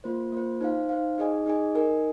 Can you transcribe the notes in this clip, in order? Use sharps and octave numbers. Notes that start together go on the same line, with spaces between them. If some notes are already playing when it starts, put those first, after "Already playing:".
A#3 F4 C5
A#3 F4 C5
D#4 C5 F5
D#4 C5 F5
D#4 G#4 D#5 G#5
D#4 G#4 D#5 G#5
D#4 A#4 D#5 G#5